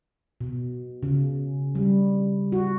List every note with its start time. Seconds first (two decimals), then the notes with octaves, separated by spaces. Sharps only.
0.41 B2
1.03 C#3
1.75 G3
2.52 F#4